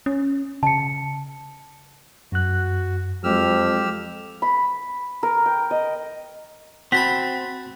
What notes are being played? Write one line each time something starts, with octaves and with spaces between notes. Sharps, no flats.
C#4
C#3 A5 C#7
F#2 F#4 F#6
F2 F#3 G#3 G4 E6 F6
B5
A#4
G5
D#5
C4 F#4 A5 B5 B6